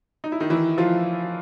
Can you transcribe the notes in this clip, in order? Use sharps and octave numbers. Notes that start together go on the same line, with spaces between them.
D#4
E4
D#3 D#4
E3 E4
F3 F4